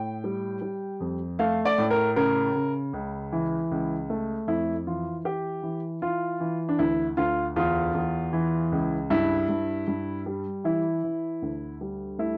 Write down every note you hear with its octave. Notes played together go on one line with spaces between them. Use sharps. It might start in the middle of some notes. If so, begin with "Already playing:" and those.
Already playing: A2 G5
G3
G3
F2
A3 F5
D5
A2
A#4
C#3 A#4
C#3
C#2
E3
C#2
A3
F2 E4
E3 F4
E3 G4
E3
E3 F4
E3
D4
D2 E4
D2 F4
E2 F4
E2
E3
C#2
G2 E4
G2
G2
G3
E3 E4
E3
D2
G3
A3 E4